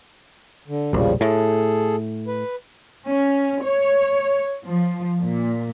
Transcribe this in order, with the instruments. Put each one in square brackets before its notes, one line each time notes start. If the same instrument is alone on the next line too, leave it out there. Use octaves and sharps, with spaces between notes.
[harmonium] D3
[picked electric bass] E1 A#1 [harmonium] C#3 F3 G3
[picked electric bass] A2 [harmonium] G#4 A4
[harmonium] B4
[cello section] C#4
C#5
F3
A#2